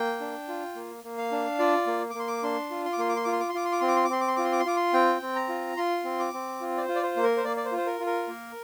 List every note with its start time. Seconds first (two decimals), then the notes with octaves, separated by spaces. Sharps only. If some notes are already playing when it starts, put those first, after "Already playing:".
Already playing: A#3 G5
0.21 D4
0.48 F4
0.76 A#3
1.04 A#3
1.18 F5
1.32 D4
1.59 F4 D5
1.87 A#3
2.10 D6
2.15 A#3 C6
2.27 D6
2.43 D4 C6
2.71 F4
2.85 C6
2.93 D6
2.98 A#3 C6
3.09 D6
3.16 C6
3.24 F4 D6
3.32 C6
3.40 D6
3.49 C6
3.54 F4 D6
3.65 C6
3.72 D6
3.81 C4 C6
3.88 D6
3.96 C6
4.04 D6
4.09 C4 C6
4.21 D6
4.28 C6
4.36 F4 D6
4.45 C6
4.52 D6
4.60 C6
4.66 F4 D6
4.76 C6
4.93 C4 G5
5.22 C4
5.36 A#5
5.49 F4
5.77 F4 C6
6.04 C4
6.19 D6
6.33 C4
6.61 F4
6.77 D5
6.81 C5
6.88 F4
6.95 D5
7.03 C5
7.16 A#3
7.23 A#4
7.37 C5
7.44 A#3 D5
7.57 D5
7.65 C5
7.72 F4
7.77 C5
7.86 A#4
8.00 F4
8.06 A#4
8.28 A#3